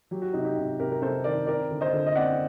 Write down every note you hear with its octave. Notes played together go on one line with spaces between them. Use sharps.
F#3 G4
F#4
C3 D#4 G4
D#4 G4
C3
C3 G4 A#4
A#4
C3 A4 C5
D#3 A#4 D5
C4 A#4 D5
D3
C5 D#5
D3
D#5
C4 D5 F#5